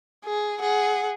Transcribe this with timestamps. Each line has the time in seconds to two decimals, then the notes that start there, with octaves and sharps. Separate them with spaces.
0.24 G#4
0.61 G#4 F#5